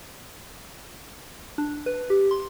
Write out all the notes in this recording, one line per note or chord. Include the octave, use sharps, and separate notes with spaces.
D4
B4
G4
C6